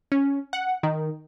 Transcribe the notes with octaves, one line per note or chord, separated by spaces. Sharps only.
C#4
F#5
D#3